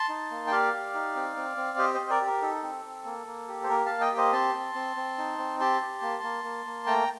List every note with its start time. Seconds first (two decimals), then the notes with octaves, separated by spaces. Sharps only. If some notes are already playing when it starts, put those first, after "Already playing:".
Already playing: A5 C6
0.09 D#4
0.31 A#3
0.47 G5
0.51 G4 D5 F5
0.73 G4
0.94 D#4
1.15 C4
1.37 C4
1.57 C4
1.78 G4 C5 D#5
1.94 C5 D#5
2.00 C4
2.10 A#4 D5
2.21 G4
2.26 A#4
2.42 D#4 A4
2.63 C4
2.85 C4
3.05 A#3
3.27 A#3
3.48 G4
3.63 C5
3.69 A#3 A#4
3.86 A#3 F5 A5
4.01 D#5 G5
4.11 G4
4.17 C5 D#5
4.32 C4 A5 C6
4.54 C4
4.75 C4
4.96 C4
5.18 D#4
5.38 C4
5.60 G4 A5 C6
5.81 G4
6.02 A#3
6.23 A#3
6.44 A#3
6.66 A#3
6.86 A3 G5 A#5